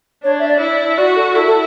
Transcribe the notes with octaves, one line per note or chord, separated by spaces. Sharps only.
D4 C#5
E5
D5
E4
D5
F#4 D5
A4
E4 A4
A4